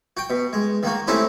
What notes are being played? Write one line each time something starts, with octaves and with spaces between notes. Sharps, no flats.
F#4 G5
B2
G#3
D#3 A#3 F#4
A3 C4 C#4 D#4 E4 G4